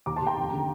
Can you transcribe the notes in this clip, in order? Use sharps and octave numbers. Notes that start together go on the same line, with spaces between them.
D#2 A#5 D6
A5 C6
D#2
G5 A#5
F1
D3